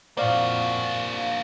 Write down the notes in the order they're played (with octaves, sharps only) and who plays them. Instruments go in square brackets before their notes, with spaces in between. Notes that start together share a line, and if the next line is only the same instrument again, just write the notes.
[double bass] F2 A#2 [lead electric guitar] A#3 F#4 [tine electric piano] C5 D5 F5